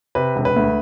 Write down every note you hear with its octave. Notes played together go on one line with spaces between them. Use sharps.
C3 B4
E1
B4
D2